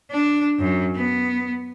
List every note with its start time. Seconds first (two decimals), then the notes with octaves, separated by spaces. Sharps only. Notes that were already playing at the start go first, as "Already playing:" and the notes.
0.11 D4
0.59 F#2
0.96 B3